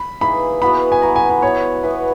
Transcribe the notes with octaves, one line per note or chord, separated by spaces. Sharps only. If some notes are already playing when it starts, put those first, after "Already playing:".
Already playing: B5
E3 A#3 D#4 G#4 B5
E3 B3 F#4 B5
G#5
E3 B3 F#4 A#5
G#5
G#5
E3 B3 F#4 C#5
E3 B3 F#4 B4